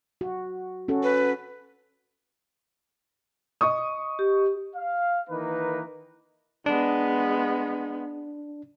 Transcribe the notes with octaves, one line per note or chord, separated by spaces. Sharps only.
F#4
C#4 F#4 A4
B4
D#5 C#6 D#6
G4
F5
D#3 E3 A#3 D#4 B4
G#3 B3 D4